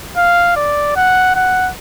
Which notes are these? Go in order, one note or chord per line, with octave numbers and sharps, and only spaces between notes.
F5
D5
F#5
F#5